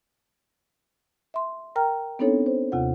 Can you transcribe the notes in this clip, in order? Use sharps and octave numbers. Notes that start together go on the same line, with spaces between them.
E5 C6
A#4 G5 A#5 F6
B3 C4 D4 D#4 A4 C#5
C5
D#2 C3 F4 F#5